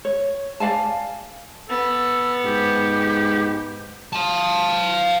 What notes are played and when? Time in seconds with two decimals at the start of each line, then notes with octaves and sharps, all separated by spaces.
0.05 C#5
0.60 D5 F5 G#5 A5
1.70 B3 A4
2.45 G#2 G4
4.13 F5 A5